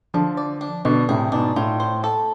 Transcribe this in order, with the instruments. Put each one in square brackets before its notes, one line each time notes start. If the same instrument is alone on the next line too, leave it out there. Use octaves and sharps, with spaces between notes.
[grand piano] D3 F3 [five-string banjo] D4
[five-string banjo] D5
D4
[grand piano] B2 D3 [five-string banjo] D4
[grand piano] A2 C3 [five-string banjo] G#4
[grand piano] G#2 B2 [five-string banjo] D4
[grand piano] A2 [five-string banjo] F4
[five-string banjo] C5
A4